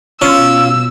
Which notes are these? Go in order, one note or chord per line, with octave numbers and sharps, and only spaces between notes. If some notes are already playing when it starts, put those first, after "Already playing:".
B2 C#4 F4 E6